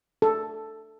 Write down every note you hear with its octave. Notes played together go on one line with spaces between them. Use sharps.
A4